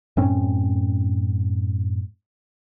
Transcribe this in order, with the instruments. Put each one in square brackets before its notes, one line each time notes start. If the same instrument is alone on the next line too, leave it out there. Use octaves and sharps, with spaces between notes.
[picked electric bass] F#2 A2 C4 C#4